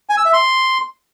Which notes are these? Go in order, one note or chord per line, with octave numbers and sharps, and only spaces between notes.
G#5
E6
E5
C6